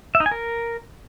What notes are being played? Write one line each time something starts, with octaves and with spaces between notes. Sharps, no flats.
E5
D#4
G#5
A#4